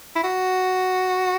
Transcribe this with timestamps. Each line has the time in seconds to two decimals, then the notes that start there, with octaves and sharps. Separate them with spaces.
0.16 E4
0.24 F#4